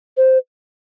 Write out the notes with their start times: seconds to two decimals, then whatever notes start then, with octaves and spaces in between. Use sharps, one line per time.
0.17 C5